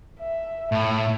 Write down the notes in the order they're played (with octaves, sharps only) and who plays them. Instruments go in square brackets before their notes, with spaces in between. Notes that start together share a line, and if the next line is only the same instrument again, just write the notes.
[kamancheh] E5
[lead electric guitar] A2 [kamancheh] E5